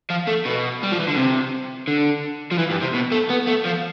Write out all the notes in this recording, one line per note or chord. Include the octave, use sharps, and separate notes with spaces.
F3
A3
B2
G3
F3
E3
D3
C3
D3
F3
E3
G2
C3
B2
A3
B3
A3
F3